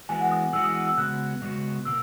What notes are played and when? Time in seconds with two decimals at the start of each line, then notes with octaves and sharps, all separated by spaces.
0.09 E3 G#3 B3 F#4 G#5
0.21 F#5
0.31 D#6
0.53 E3 G#3 B3 F#4 E6
0.64 D#6
0.87 E6
0.97 C#3 G#3 B3 F#4 F#6
1.42 C#3 G#3 B3 F#4
1.85 B2 A#3 E6